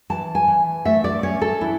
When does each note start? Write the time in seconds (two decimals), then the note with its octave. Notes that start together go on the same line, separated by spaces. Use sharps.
0.10 E3 A5
0.35 G#5
0.48 E3
0.85 A3 E5
1.04 D5
1.23 C#4 C#5
1.41 A4
1.61 E3 E4